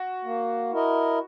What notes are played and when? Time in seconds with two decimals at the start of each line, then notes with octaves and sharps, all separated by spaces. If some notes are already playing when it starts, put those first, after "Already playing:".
Already playing: F#4
0.24 A#3
0.72 E4 A#4 D#5